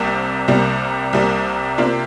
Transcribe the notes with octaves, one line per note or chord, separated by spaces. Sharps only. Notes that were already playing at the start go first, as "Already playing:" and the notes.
Already playing: C2 C3 G3 A#3
C2 C3 G3 A#3
C2 C3 G3 A#3
C3 A#3 D4 F4